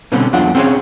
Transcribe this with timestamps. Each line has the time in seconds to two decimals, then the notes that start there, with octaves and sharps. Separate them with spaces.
0.12 B2 D3 G3 C4 C#4
0.33 E2 F#3 D4 F4 F#5
0.55 C4 C#4 G#4 A#4 C5 C#5